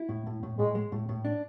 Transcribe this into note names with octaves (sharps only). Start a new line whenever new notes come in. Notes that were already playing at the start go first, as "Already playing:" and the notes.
Already playing: E4
A2
A2
A2
A2 G#3
G#3
A2
A2
D4